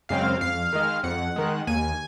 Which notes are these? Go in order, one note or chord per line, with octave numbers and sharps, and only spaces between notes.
F#2 C#3 G#3 C4 F5
F2 F5
D#3 G#3
F2 F#5
D#3 G#3
D#2 G#5